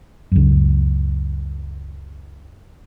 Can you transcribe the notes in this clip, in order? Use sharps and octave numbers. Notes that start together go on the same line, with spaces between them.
C#2 F#2